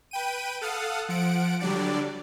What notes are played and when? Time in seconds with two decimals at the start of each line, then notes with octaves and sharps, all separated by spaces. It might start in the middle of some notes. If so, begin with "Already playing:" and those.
0.11 B4 G5 D#7
0.61 A4 F5 F#5 D#6
1.09 F3 F#5 D7
1.60 D3 F#3 G3 D4 D5